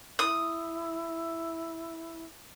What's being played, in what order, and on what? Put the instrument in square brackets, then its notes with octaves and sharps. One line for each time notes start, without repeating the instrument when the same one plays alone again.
[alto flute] E4 [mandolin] D#6